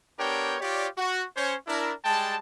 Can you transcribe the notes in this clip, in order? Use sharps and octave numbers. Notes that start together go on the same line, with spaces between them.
B3 D4 G4 A#4 C#5 G5
F4 G4 C#5 D5
F#4
C#4 C5 C#5
D4 E4 A#4
G3 G#3 G5 A5